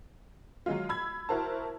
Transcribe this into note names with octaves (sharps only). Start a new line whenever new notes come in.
F#3 G#3 F4
B5 E6 G#6
E4 F#4 A#4 C5 A5